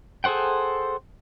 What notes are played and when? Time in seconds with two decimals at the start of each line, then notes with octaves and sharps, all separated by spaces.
0.24 G#4 A4 C5 F#5 G5